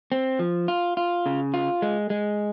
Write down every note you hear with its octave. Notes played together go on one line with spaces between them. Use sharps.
C4
F3
F4
F4
C#3
F4
G#3
G#3